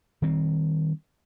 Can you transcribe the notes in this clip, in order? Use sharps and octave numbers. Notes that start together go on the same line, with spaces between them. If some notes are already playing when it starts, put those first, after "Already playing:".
D#3 G3 C4